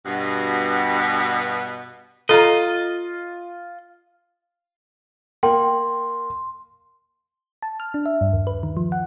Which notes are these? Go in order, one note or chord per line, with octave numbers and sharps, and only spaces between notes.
G2 B2
F4 A4 D#5 A#5
A#3 G5 C6
A5
F6
D4
E5
G2
D#2
B4
D#3
F3
F#5